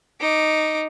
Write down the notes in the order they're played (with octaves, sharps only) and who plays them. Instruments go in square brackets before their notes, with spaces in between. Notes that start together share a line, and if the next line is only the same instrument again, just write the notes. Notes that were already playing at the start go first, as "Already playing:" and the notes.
[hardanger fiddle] D#4 D6